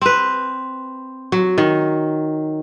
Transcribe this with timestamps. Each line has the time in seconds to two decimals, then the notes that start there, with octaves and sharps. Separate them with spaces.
0.02 C4 B4
1.32 F#3
1.58 D#3